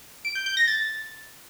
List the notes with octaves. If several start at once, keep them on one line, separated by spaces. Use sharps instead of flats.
D7
G6
G6
A#6
A6